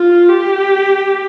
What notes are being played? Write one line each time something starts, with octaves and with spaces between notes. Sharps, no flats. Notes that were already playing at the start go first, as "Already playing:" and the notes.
Already playing: F4
G4